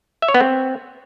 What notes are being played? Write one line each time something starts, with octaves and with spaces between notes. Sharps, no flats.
E5
C#5
B3
C4